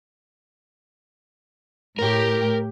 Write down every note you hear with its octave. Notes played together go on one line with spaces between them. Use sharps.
A2 G4 A#4